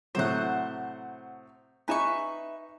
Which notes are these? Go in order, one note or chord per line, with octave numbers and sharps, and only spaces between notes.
A2 C3 F#3 C5 F#5
D#4 B4 E5 G#5 A#5 C#6